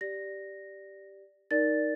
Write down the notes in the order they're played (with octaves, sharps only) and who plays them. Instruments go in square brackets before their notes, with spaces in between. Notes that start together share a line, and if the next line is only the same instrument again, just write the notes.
[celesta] G4 D5 A#6
D#4 A#4 D5 A6